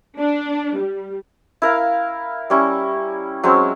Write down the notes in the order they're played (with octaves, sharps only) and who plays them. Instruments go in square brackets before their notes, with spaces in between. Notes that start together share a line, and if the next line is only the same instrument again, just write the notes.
[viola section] D4
G3
[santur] E4 A#4 F5
G3 C#4 E4
F#3 G#3 C4 C#4